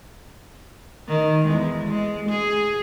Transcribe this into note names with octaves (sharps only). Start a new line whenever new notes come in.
D#3
E2 G#3
G#3
G#4